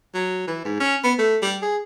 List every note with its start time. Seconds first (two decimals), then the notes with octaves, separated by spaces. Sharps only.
0.14 F#3
0.47 E3
0.65 G#2
0.80 C#4
1.04 B3
1.18 A3
1.42 G3
1.62 G#4